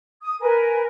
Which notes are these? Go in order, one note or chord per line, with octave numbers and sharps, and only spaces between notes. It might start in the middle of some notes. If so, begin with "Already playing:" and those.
D#6
A#4 B4 G#5